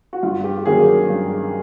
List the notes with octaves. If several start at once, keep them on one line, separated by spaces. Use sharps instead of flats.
F#4
G2 F4
G4
D#3 F#3 A#3 C#4 G#4
G2